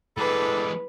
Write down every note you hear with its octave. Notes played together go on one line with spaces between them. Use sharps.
A2 E3 G#3 D4 A4 B4